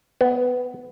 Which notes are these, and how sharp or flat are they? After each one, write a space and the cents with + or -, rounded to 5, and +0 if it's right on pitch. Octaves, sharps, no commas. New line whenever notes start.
B3 +10